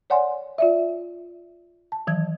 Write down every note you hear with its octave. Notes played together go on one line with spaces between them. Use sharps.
C#5 D5 F#5 G#5 C6
F4 D5 E5
A5
D#3 E3 F#3 G#6